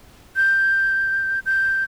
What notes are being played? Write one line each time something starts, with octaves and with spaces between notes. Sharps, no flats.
G6
G6